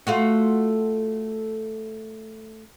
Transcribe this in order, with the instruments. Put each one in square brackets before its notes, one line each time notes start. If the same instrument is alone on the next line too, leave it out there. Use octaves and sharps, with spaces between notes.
[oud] A3 F4 F#4